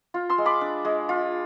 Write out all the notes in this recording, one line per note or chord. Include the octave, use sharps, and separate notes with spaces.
F4
C6 E6
G#3
B5 D6
D4
G#3
F4